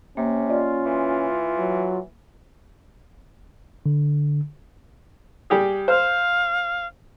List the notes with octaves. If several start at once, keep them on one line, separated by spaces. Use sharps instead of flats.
C3 A#3 C#4
F4 D5 D#5
E3 C6
F#3
D3
G3 G4 G#4
C5 F5